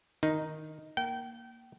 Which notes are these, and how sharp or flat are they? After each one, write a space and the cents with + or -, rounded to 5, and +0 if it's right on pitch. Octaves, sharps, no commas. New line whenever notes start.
D#3 +0 D#4 +0
A#3 +0 G5 -30